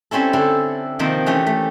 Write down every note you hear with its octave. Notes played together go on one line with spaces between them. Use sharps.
G3 C4 C#4 E4 A4
D3 E4 G4 A4
C3 D#3 F3 A#3 C4
E3 A3 C#4 G4
A3